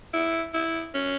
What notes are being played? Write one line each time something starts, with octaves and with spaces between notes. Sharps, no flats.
E4
E4
C#4